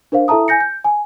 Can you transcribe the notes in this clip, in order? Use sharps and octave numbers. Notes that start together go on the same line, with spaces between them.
D4 A#4 C5 F5
E4 A4 E5 A5 A#5 D#6
G#5 G6 A#6 C#7
G6
G#5